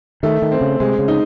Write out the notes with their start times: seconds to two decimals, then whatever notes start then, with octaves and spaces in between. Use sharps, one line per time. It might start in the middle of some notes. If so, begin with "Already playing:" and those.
0.23 D#3 A3
0.42 D#3
0.52 C4
0.61 C#3
0.80 C3 G#3
0.99 C#3
1.08 D#4